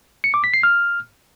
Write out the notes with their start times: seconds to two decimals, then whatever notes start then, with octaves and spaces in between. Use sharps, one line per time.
0.24 C#7
0.34 D6
0.44 B6
0.54 C7
0.63 F6